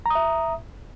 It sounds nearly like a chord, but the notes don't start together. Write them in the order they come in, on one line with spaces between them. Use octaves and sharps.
A#5 D#6 E5